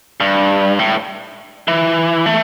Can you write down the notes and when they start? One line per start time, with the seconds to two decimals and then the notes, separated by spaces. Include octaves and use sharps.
0.20 G2
0.79 A2
1.68 E3
2.26 A3